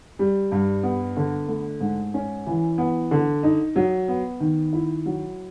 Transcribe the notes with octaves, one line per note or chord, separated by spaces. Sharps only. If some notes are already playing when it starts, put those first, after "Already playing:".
G3
G2
B3
D3
A3
G#2
C#4
E3
B3
D3
D#4
F#3
B3
D#3
E4
F#3